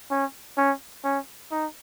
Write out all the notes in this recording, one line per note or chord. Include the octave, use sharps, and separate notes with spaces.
C#4
C#4
C#4
D#4